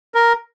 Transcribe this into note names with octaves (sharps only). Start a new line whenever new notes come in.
A#4